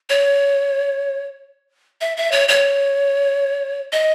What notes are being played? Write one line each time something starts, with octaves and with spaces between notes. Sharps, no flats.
C#5
E5
E5
C#5
C#5
D#5